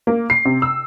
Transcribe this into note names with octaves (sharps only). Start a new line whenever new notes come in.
A#3
C7
C3
E6